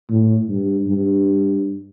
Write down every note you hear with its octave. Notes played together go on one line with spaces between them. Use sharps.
A2
G2
G2